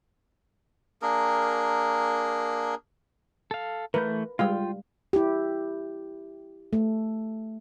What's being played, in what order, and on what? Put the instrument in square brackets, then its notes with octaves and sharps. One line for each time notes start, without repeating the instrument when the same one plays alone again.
[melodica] A#3 D4 G#4 A#4
[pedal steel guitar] A4 F5
[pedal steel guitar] E3 A3 G6 [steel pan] A#4 B4
[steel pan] G3 G#3 F5 [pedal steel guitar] F4 G5
[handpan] E4 G4
A3